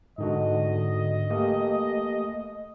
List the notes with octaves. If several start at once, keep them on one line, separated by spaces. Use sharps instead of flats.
G#2 D3 F#4 D#5
A3 A#3 G4